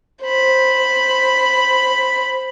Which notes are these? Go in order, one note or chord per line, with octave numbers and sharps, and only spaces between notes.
C5 B5